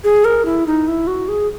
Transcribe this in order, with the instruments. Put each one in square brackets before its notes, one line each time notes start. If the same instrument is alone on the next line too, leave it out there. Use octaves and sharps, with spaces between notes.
[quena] G#4
A#4
E4
D#4
E4
F#4
G#4